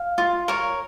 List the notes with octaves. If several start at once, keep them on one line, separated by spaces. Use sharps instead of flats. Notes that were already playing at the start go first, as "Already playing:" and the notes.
Already playing: F5
F4
A#4 C#5